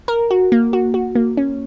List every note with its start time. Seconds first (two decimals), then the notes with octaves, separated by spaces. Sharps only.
0.08 A#4
0.31 F#4
0.52 A#3
0.73 F#4
0.94 F#4
1.15 A#3
1.37 C#4